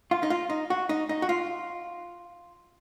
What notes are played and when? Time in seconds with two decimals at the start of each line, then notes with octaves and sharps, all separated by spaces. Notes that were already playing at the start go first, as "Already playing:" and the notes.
0.11 F4
0.23 D#4
0.30 F4
0.50 D#4
0.70 F#4
0.89 D#4
1.09 D#4
1.22 F#4
1.29 F4